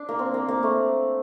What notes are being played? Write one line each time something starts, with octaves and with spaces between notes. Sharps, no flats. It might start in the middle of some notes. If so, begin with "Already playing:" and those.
Already playing: D4
A#3
C4
A#3
A#3
A3